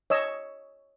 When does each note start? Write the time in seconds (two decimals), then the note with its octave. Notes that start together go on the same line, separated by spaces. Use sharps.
0.10 C#5 D#5 E6